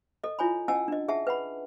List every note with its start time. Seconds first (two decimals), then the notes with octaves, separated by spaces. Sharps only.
0.24 A4 D#5
0.39 E4 F4 C#5 G#5 B5
0.68 C#4 D#5 F#5 G#5 A5 E6
0.88 D4 D#5
1.08 G#4 E5 F#5 A5
1.27 B4 F#5 B5